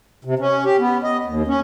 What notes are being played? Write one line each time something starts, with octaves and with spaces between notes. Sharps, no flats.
C3
C#4
G4
B3
D#5
D#2
C#4